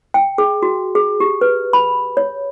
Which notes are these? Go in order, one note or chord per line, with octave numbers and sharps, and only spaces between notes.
G5
G#4
F#4
G#4
G4
B4
B5
C#5